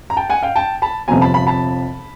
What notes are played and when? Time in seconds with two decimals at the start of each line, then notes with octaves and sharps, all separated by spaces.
0.10 A#5
0.17 G5 A5
0.30 F#5 G#5
0.43 F5 G5
0.56 G5 A5
0.82 A5 B5
1.08 G1 F2 C3 F3 G#5 A#5
1.22 A5 B5
1.34 A5 B5
1.47 A5 B5